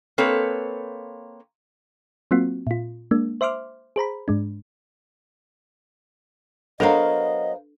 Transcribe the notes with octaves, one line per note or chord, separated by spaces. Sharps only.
A#3 C4 A4 B4 C#5
F#3 A#3 C4 F4 F#4
A#2 F4
G#3 A#3 D4
C5 E5 C6 D6 F6
G#4 C5 A#5 B5
G#2 G#3 D4
F#3 B3 D4 A4 A#4 C5 D#5 F5